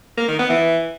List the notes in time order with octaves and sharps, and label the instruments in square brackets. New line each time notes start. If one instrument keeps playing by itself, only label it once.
[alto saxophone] A#3
D#3
B3
E3